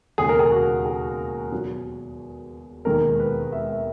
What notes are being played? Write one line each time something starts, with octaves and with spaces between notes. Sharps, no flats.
E1 D#2 C#3 G#4
A#4
G#4
F#4
G#4
E2 B2 F#3
E1 D#2 D#3 G#3 A#4
B4
E5
E5